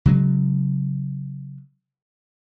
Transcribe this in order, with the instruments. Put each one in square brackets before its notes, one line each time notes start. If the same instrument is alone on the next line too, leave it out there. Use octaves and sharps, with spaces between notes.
[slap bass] C#3 F#3 G#3